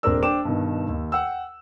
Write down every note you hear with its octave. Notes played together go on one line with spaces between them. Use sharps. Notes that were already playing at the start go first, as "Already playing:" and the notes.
D#1 C4 D4 A#4 D5 E6
D4 C5 G5 D6 E7
G2 B2 D#3
D#2
F#5 G5 E6